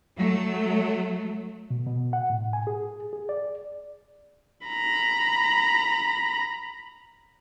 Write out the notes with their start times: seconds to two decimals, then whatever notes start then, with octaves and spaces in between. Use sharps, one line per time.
0.17 F#3 A3
1.70 B2
1.87 B2
2.13 F#5
2.30 A2
2.53 G#5
2.67 G#4
3.13 G#4
3.29 D5
4.67 A#5 B5